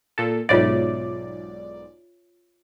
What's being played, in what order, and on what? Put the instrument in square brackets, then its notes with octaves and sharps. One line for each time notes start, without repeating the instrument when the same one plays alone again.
[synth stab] A#2 A4
[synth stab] B1 G#2 D5 [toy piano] F4 C#5 E5